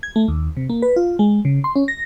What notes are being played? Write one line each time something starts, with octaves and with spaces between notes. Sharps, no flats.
G#6
A3
D#2
C3
A#3
B4
F4
G#3
C#3
C6
C#4
A#6